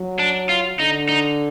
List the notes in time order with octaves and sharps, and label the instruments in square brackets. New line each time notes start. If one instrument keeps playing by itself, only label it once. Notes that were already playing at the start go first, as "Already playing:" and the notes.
Already playing: [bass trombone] F#3
[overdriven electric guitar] D4
F4
[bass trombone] D3 [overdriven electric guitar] D#4
[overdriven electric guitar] D#4